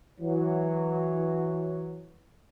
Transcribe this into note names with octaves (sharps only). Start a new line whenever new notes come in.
E3 F#3